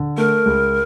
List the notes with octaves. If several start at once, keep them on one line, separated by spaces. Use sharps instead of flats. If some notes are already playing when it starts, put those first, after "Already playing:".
Already playing: D3
A3 A#4
C#2